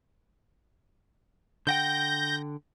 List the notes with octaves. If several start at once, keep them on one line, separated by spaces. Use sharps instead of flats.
D3 F#5 G5 G6 A#6